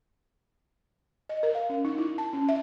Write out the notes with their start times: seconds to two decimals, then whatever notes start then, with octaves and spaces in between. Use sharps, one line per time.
1.29 D#5
1.43 A#4
1.55 F5
1.70 C#4
1.85 D#4
1.98 E4
2.18 A5
2.33 C#4
2.49 E5